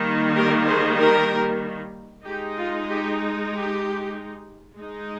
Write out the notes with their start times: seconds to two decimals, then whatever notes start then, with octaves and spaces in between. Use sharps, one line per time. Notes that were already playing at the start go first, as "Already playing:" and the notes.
Already playing: D#3 G3 A#3
0.36 G4 A#4
0.67 G#4 C5
0.99 G4 A#4
2.25 G#3 D#4 G4
2.57 F4
2.88 G4
3.51 G4
4.76 G#3 D#4